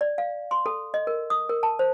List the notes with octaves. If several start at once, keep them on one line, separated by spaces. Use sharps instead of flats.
D5
F5
C6
A4
D#5
A#4
D#6
A#4
A5
C5